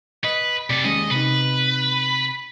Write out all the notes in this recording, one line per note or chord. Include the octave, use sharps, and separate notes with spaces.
B4 D#5
C3 A4 D5
D#2 G#3 C#4 D#5
C3 D#4 B4